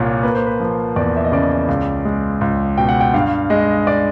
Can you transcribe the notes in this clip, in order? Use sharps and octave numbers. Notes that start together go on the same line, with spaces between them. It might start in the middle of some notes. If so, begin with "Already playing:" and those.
Already playing: C2 A#2 C#5
A#3 B4
C5
B4
F3
E2 D5
E5
D#5
C#3 D5
C#2
G#3
C#2
B2 G5
F#5
G5
G2 F5
G#3 D#5
D5